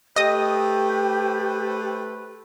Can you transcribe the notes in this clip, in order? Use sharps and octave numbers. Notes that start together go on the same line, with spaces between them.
A3 G4 B4 C5 D#5 D#6